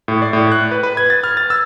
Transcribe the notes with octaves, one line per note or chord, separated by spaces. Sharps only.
A2
D5
A2
F#6
B4
B4
G#6
A6
F6
A6
E6